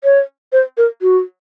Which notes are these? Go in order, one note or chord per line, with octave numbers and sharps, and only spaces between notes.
C#5
C5
A#4
F#4